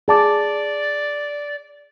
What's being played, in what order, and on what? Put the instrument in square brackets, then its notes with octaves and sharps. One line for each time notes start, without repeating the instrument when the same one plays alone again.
[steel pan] G#4 A5 D6 [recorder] D5